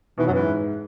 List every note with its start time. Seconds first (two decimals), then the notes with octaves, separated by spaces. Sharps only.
0.18 B2 D#3 E3
0.26 F#2 F#3
0.34 E3
0.39 G#2